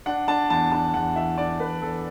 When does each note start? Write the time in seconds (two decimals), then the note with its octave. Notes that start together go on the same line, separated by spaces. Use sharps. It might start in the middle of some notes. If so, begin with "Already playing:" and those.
0.06 D4 F#5
0.28 D4 A5
0.50 E2 A5
0.72 D4 A5
0.94 E2 F#5
1.16 E3 E5
1.38 D4 D5
1.60 E2 B4
1.82 E2 A4